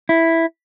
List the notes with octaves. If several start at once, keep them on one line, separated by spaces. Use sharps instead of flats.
E4